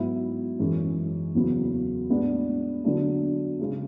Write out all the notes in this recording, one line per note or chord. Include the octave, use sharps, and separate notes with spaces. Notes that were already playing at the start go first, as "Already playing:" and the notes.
Already playing: G#2 F#3 B3 E4
F#2 E3 G#3 C#4
E2 C#3 F#3 B3
A2 G#3 B3 D4
D3 F#3 B3 D4
C#3 G#3 C#4